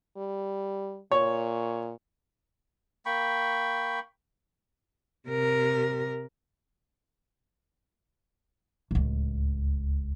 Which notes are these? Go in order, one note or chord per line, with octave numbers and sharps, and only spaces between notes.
G3
A#2 C#5
A#3 G5 B5 C#6
C3 A#4
D1 C#2